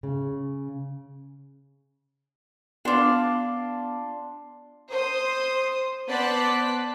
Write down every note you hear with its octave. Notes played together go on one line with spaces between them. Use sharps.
C#3
B3 D4 F4 C6 D6
C5 D#6
B3 C5 D5 A5 F#6 B6